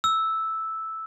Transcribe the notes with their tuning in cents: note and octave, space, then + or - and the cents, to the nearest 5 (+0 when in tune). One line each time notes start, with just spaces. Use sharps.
E6 -5